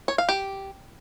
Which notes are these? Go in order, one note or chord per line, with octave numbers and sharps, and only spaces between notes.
C#5
F5
G4